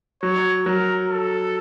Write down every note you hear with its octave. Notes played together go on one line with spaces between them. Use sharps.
F#3 C#5
F#3 A#4
A4